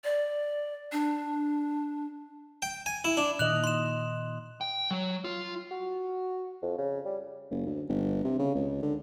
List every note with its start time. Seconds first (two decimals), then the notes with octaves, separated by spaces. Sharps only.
0.04 D5
0.92 D4
2.62 G5
2.86 G#5
3.04 E4
3.17 D4
3.39 A#2 D#3 D#5 F#6 F7 F#7
3.64 C6 E7
4.61 G5
4.91 F#3
5.24 F4
5.71 F#4
6.62 F2
6.78 C#3
7.06 G3
7.51 F#1
7.66 D2
7.89 G1
8.24 C3
8.39 C#3
8.55 C#2
8.83 D3